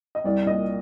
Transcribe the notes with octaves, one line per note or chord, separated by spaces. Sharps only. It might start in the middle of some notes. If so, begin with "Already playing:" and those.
D#5
C2 D5
A#2 D#5